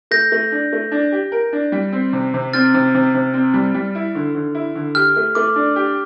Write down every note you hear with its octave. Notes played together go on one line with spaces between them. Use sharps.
A3 G6 A#6
A3
D4
A3
D4
G4
A#4
D4
G3
C4
C3
C3
C4 F6 A6
C3
C3
C3
C4
G3
G3
E4
D3
D3
E4
D3
G4 F6
A3
A3 D6
D4
G4